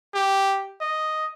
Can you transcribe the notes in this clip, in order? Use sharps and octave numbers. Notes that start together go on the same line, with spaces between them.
G4
D#5